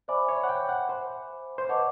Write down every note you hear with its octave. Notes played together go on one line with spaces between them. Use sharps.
C5 D5 E5 G#5 B5 D6
C#5
F#5
G5
F#5
C5
C5
B4 C#5 D#5 F#5 A5 D6